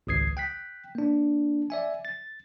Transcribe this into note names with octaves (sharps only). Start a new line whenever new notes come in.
G#1 C#2 D#6 G#6 C7
G5 F#6 B6
A#3 D4
D5 E5 G#5
A6